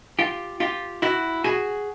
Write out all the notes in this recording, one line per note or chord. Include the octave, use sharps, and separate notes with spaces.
F4 G4
F4 G4
E4 F#4
F#4 G#4